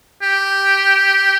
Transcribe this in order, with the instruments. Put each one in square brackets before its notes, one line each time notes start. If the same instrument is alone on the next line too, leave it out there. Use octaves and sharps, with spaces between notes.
[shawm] G4